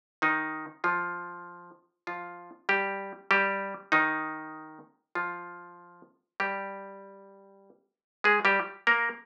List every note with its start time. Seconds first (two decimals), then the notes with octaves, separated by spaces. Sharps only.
0.22 D#3 D#4
0.84 F3 F4
2.07 F3 F4
2.69 G3 G4
3.31 G3 G4
3.92 D#3 D#4
5.15 F3 F4
6.40 G3 G4
8.24 G#3 G#4
8.45 G3 G4
8.87 A#3 A#4